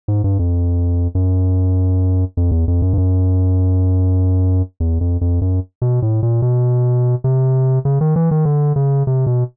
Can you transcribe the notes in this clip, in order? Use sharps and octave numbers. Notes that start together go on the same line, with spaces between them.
G#2
G2
F2
F#2
F2
E2
F2
F#2
G2
F#2
E2
F2
F2
F#2
B2
A2
A#2
B2
C3
C#3
D#3
E3
D#3
D3
C#3
C3
B2